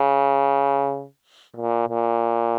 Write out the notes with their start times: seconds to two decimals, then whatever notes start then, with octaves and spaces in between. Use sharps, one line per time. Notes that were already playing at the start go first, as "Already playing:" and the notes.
Already playing: C#3
1.56 A#2
1.89 A#2